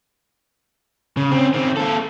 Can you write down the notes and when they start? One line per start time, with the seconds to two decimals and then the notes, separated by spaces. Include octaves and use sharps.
1.17 C#3
1.31 C4 C#4
1.53 D#3 C4
1.77 A#3 A4